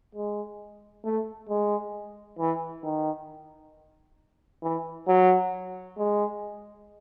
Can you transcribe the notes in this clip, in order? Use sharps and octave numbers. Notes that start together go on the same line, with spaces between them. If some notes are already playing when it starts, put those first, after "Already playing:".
G#3
A3
G#3
E3
D#3
E3
F#3
G#3